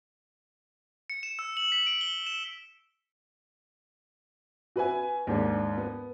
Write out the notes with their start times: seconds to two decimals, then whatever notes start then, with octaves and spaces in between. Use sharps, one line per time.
1.10 C#7
1.23 E7
1.39 E6
1.57 F#7
1.72 B6
1.87 D7
2.01 G7
2.27 E7
4.76 F#4 B4 E5 G#5
5.27 D#2 G#2 D4
5.78 B3